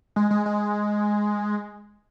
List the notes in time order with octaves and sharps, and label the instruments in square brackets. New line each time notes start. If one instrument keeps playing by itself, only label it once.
[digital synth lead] G#3
G#3
G#3